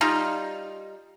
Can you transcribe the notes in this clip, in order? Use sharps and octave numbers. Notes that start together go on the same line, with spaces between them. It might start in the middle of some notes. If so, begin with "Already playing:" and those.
G3 D#4 F4